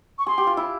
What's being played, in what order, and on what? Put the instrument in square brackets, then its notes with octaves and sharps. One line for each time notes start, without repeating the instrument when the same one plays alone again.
[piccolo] C#6
[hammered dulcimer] G#4 [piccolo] C6
[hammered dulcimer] G4
F4
E4